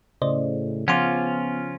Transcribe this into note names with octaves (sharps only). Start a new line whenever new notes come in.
A2 C#3 C5 D5 D#5
F3 B3 C#4 F4 F#5 C6 D6